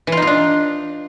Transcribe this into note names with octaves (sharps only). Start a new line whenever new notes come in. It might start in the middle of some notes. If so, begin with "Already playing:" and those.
E3
F4
D#4
F4
D4